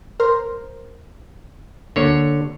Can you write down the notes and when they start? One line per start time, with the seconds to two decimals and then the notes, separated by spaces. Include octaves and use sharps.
0.20 A#4 C5
1.96 D2 D3 A#3 C#5